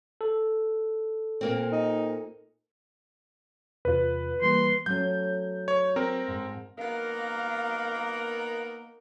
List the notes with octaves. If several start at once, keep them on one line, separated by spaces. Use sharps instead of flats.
A4
A#2 A#3 C4
D#4
E2 C3 F4 B4
E3 G3 A#3 C6
F#3 A3 C#4 G6
C#5
C4 A#4
G#2 F3
A#3 B3 D#4 A#4 F5